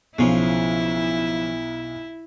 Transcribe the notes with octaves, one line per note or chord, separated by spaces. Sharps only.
B1 C#3 F3 E4